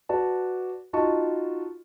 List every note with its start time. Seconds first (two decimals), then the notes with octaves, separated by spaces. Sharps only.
0.09 F#4 B4 D5 A5
0.93 D#4 F4 F#4 D#5 A5 C#6